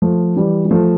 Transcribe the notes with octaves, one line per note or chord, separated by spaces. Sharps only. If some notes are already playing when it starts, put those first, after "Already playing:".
F3 A3
E3 G3
G3
F3 A3